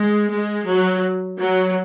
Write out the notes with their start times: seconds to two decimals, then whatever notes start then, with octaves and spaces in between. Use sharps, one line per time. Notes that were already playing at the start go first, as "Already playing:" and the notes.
Already playing: G#3
0.29 G#3
0.66 F#3
1.39 F#3